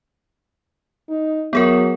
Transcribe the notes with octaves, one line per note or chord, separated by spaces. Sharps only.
D#4
F#3 B3 G#4 A#4